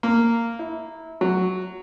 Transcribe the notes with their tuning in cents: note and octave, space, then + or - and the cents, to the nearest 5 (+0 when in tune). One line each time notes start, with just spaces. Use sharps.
A#3 -10
E4 -25
F#3 +0